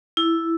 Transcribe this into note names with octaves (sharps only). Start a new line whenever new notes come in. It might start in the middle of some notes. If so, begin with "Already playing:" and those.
E4